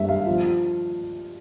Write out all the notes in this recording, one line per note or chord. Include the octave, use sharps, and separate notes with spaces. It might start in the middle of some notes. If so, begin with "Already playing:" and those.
Already playing: G2 E5
F5
F3